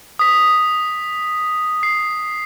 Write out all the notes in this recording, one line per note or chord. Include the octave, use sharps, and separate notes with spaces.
D#6 B6
C7